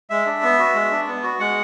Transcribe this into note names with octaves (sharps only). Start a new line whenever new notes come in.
G#3 E5
D4
B3
F#4
G#3
D4
B3
F#4
G#3 F#5